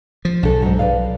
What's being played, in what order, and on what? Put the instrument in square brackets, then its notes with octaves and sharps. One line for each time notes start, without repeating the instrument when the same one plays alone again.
[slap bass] F3
[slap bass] B1 [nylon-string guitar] D4 A4
[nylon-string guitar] G#2 F#3
B4 D5 F5